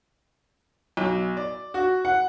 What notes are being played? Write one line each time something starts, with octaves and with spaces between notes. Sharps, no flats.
B1
D5
F#4
F#5